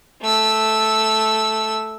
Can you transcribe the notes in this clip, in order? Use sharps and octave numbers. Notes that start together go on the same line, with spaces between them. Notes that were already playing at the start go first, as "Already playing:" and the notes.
A3 E6